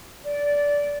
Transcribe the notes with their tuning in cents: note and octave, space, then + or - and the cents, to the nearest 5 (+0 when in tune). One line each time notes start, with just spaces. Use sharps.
D5 -15